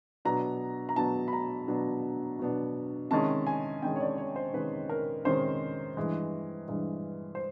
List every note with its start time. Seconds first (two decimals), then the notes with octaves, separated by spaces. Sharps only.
0.25 B2 F#3 B3 D4 A#5
0.89 A#5
0.96 B2 F#3 B3 D4 A5
1.28 B5
1.33 A#5
1.68 B2 F#3 B3 D4
2.39 B2 F#3 B3 D4
3.11 C3 D#3 G#3 C#4 A5
3.47 G#5
3.82 C3 D#3 G#3 C#4 G5
3.96 C#5
4.00 D5
4.18 C#5
4.36 C5
4.53 C3 D#3 G#3 C#4 B4
4.89 A#4
5.25 C3 D#3 G#3 C#4 C5
5.97 G2 E3 G#3
6.68 G2 E3 G#3
7.35 C5